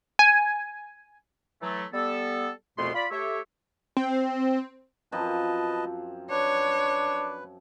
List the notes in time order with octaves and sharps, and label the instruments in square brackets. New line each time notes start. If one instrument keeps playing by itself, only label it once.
[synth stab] G#5
[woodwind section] E3 F#3 A3
G3 B3 A4
C2 F2 B2 A3 B3 C6
F4 D5 B5
A3 G4 C#5 E5
[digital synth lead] C4
[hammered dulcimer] F#2 F3 C4 [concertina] B4 D#5 A5
[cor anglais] D4 [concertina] B4 [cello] C#5